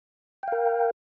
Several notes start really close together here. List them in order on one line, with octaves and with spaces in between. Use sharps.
G5 F5 A#4